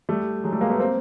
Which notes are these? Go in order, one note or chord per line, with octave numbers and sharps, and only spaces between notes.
G3 A3
F#3 G#3
G3 A3
G#3 A#3
A3 B3
A#3 C4